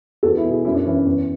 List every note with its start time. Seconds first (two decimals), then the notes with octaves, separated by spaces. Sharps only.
0.23 E2 F#4 A4
0.37 E4 G#4
0.44 B2
0.51 E4 G#4
0.65 F#2 C#4 E4
0.75 D4 F#4
0.85 E3 C#4 E4
0.96 C#4 E4
1.06 E2